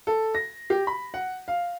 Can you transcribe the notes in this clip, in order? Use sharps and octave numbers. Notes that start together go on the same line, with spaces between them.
A4
A#6
G4
B5
F#5
F5